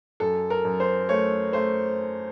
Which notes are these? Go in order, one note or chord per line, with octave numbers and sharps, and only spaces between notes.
F#2 A4
A#4
F#2
C5
A3 C#5
A3 C5